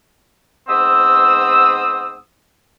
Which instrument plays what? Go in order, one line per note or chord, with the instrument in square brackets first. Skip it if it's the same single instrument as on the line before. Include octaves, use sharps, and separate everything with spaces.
[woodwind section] G#2 B3 C4 D#6 E6